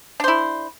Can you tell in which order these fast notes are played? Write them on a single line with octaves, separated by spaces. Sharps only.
D4 C5 E4